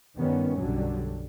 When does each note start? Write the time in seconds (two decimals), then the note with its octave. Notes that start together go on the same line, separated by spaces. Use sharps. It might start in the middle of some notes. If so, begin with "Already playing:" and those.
0.16 G2 D#3 G3 B3 C#4
0.56 B1 F#2 D3 F#3 G3